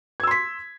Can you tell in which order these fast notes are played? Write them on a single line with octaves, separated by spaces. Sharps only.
G#6 E6 C6 B6